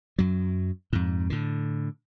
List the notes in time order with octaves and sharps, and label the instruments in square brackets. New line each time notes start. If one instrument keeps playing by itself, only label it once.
[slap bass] F#2 F#3
F2 G#2
A2 D3